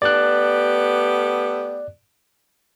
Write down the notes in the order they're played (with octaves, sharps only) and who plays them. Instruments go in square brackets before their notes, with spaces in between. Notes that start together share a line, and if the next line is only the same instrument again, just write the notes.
[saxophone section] A3 B3 G4 [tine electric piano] D5 F#6